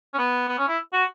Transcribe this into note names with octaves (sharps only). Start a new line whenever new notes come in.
C#4
B3
B3
C#4
E4
F#4